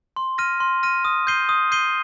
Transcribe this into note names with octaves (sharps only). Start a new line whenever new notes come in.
C6
F6 A#6 D#7
C6
F6 A#6 D#7
D#6
G6 C7 D#7 G7
D#6
G6 C7 D#7 G7